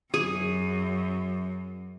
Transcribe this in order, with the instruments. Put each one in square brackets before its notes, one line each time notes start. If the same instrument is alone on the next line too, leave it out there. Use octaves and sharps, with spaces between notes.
[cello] F#2 [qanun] G#4